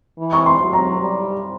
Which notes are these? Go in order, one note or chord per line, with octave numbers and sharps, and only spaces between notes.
E3
C#6
C6
F#3
A#5
G3